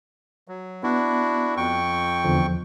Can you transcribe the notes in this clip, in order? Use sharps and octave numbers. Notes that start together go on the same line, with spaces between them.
F#3
B3 D4 E4 F#4
F2 G5 C#6
E2 D3 F3